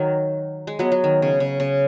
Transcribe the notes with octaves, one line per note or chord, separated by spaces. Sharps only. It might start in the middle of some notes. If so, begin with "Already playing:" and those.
Already playing: D#3 F#3
G#3
F#3 B3
F#3
D#3
C#3
C#3
C#3